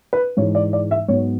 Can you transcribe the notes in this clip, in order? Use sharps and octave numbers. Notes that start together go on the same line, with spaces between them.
B4
G#2 E3 G#3 C#5
D5
D5
E5
G#2 F#3 B3 C#5